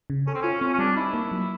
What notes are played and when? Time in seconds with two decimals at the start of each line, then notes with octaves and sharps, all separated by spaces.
0.10 C#3
0.27 C#4 A4
0.35 C4
0.42 C#4 F4
0.61 C4 C#4
0.74 C#4
0.78 G3 D4
0.96 D#4 E4
1.14 A#3
1.32 F#3